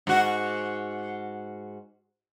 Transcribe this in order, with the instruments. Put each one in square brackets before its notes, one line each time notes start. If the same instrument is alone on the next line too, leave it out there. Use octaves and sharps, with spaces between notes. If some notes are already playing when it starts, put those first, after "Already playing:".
[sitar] G#2 F#4